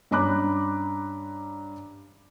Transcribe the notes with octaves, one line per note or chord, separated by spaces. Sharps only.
G2 C#4 A#5 B5 D6 F#6